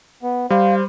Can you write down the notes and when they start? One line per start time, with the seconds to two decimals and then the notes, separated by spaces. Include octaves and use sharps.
0.23 B3
0.50 G3 C5 F5